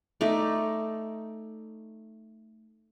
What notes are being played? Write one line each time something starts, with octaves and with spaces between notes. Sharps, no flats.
A3 D#4 D5